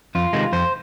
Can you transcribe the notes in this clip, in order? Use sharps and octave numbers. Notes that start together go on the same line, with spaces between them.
F2 F4
C3 D#3 G#3
F2 C5